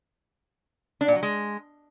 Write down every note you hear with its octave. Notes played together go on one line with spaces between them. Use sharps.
D4
A#2
F#3
G#3